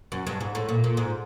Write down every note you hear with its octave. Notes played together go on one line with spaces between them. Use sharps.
F#2
G2
G#2
A2
A#2
A#2
G#2